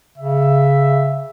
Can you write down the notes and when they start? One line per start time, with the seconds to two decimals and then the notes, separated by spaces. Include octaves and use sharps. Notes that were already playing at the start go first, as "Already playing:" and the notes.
0.18 C#3 E5